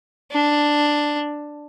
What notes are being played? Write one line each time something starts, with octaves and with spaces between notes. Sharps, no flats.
D4